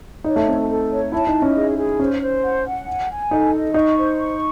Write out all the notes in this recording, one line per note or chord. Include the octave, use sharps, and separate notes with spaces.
D#4 C#5
A3
C4 A4
A4
C#5
E4 A5
D#4
D#5
C#4
G#4
G#4
C#4 C5
C5
F#5
F#5
G#5
G#5
D#4 A4
D#5
D#4 C#6
C5
C#6